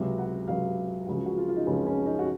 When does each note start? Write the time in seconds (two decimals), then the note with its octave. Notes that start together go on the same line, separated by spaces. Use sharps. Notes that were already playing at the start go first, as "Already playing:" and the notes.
Already playing: C#2 C3 F#3
0.18 F#5
0.48 C#2 C3 F#3 F5
1.07 C#2 C#3 F3 F#4
1.26 F#4
1.37 F4
1.48 F4
1.56 D#4
1.67 C#2 C#3 F3 C#4
1.87 C#4
2.06 D#4
2.19 F#4